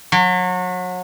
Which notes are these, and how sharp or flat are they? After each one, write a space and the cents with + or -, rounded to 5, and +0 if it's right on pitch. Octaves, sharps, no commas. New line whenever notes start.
F#3 -30